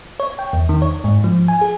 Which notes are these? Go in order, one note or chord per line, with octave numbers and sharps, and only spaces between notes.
C#5
G5
E2
D#3
C#5
G#2
F3
G#5
G#4